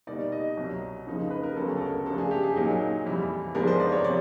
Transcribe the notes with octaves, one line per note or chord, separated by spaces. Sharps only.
B2 G3 A#3 D#4 D5
D#5
C2 B2 F#3
F2 C#3 F3 A#3 D#4
B4
A#4
D2 C#3 F#3 B3 A4
A4
A#4
C#3 F3 A3 D4 A4
G#4
G4
G#4
A#2 F#3 A#3 D#4
F2 C3 E3 G3
G#2 F3 G#3 B3 D4 A#4
C5
D5
C#5
C3 F3 D5